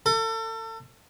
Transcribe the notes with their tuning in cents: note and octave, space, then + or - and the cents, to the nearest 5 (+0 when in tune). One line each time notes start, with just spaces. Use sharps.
A4 +35